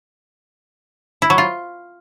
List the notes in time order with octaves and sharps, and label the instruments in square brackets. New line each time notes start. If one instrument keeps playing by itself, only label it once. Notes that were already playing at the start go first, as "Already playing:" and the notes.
[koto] E4
F#3
F4